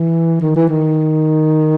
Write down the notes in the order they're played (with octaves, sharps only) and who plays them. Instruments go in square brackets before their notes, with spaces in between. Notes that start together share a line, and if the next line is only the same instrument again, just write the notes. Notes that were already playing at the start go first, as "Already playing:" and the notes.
Already playing: [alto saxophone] E3
D#3
E3
D#3